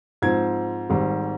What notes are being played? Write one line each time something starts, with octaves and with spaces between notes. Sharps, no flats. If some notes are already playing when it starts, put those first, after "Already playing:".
G#2 F3 C4 G#6
G#1 G#2 G3 C4